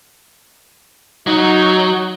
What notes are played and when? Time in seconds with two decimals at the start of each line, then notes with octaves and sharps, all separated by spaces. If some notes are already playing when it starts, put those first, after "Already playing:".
1.27 F#3 D#4